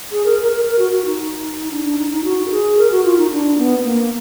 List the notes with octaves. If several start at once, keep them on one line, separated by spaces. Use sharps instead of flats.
G#4
A#4
A#4
A#4
A#4
F#4
F#4
D#4
D4
D4
D#4
D#4
F#4
A#4
G#4
A#4
F#4
F4
D#4
D4
B3
B3
A#3